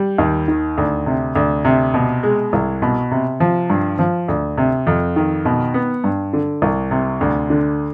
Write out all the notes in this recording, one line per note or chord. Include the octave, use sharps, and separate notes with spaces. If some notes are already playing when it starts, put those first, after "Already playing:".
Already playing: G3
D#2
D#3
D2
C3
D2
C3
B2
G#3
C2
B2
C3
F3
G2
F3
D2
C3
F2
D#3
B2
B3
G2
D3
C2
C3
D2
D3